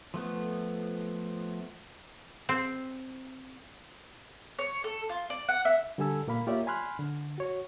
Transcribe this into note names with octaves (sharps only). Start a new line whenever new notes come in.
F3 A3 B3
C4
C#5
A4
F4
D5
F#5
E5
D3 G3 G4 A4 G#5 E6
A#2 A#3 F5 B5
A#3 F4 G4 C#5 D5 E5
G#5 B5 C6 F6 F#6
D3
F#4 C#5